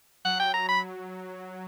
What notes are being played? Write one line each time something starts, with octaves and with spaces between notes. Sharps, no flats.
F#3 F#5
G5
A#5
B5